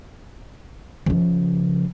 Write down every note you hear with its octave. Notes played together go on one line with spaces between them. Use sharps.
C#3 F3